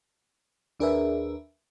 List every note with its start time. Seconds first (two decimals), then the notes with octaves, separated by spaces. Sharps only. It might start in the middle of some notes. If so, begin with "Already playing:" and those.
0.80 D#2 D4 G#4 A#4 B4 E5